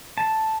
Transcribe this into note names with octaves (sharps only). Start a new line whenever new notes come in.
A5